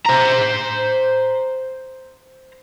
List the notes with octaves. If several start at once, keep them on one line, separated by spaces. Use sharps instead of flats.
C5 A#5